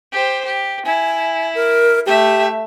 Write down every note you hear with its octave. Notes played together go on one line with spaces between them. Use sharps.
G4 C5
G4
E4 G#5
A#4
A3 G4 E5